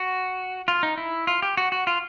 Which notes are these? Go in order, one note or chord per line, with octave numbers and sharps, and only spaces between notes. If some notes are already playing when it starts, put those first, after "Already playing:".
Already playing: F#4
F4
D#4
E4
F4
G4
F#4
F#4
F4